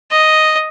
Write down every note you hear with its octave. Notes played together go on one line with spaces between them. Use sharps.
D#5